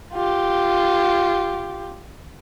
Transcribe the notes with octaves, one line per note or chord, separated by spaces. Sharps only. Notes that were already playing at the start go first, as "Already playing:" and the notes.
F4 G4